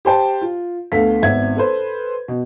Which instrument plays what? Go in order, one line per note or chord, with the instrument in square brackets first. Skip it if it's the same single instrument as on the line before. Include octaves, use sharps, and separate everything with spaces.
[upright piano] G4 C5 G5 A5
F4
D2 A3 B3 A4 F5 B6
G#1 B3 C4 E5 G#6
A4 B4 C5
B2